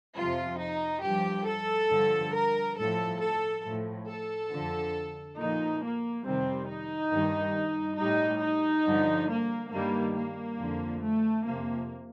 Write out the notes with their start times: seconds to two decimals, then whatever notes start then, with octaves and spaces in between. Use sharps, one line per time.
0.17 F2 C3 F3 F4
0.60 D#4
1.04 G2 F3 G4
1.47 A4
1.91 G2 D3 F3
2.34 A#4
2.78 A2 F3 A4
3.21 A4
3.64 A2 F3
4.08 A4
4.51 F2 D3 F3
5.38 A#2 F3 D#4
5.81 A#3
6.25 F2 C3 D#3 G3 C4
6.68 D#4
7.11 G2 D#3 G3
7.98 A2 G3 D#4
8.41 D#4
8.85 G2 D3 F3
9.29 A#3
9.72 G2 D#3 G3 A#3
10.15 A#3
10.59 F2 D3 F3
11.02 A3
11.45 F2 C3 F3 A#3